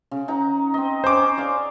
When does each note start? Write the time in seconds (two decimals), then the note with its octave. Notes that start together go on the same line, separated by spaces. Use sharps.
0.11 C#3
0.28 D#4 F#5 A#5
0.74 C4 D#5
1.04 C#4 C5 G#5 D6
1.37 G#4 D5 F5